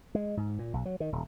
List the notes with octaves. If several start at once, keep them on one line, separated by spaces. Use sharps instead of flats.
G#3
G#2
A#2
B1
F#3
D#3
D#1